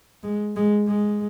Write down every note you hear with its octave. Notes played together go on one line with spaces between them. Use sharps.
G#3
G#3
G#3